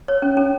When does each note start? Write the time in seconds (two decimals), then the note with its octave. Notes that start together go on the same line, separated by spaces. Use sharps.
0.08 C#5
0.22 C#4
0.37 C#4